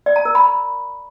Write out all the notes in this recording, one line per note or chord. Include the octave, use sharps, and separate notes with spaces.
D5
A#5
A#4
B5